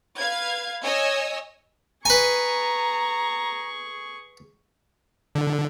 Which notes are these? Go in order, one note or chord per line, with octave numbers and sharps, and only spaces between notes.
B4 F5 G#6
C#5 D#5 G#5 E6
G#4 B4 G#5 A#5 C#6
D3